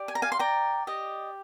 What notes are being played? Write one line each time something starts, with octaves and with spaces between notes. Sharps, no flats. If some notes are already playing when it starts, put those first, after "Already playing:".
Already playing: G4 D5
G#5
A#5
F5 G#5
C6
D5 G5 A#5
G4 D#5